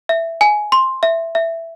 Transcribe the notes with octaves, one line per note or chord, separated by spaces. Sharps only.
E5
G#5
C6
E5
E5